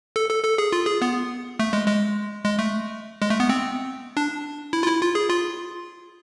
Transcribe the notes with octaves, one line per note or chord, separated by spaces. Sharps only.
A4
A4
A4
G#4
F4
G#4
B3
A3
G#3
G#3
G#3
A3
G#3
A3
B3
C4
D4
E4
F4
E4
F4
G#4
F4